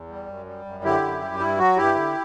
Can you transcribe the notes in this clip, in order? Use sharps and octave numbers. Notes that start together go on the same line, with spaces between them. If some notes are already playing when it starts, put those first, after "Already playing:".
Already playing: E2
G3
F#2
G3
F#2
D3 E4 G4
F#2
G3
G2 E4
F#3 F#4
G2 E4 G4
D3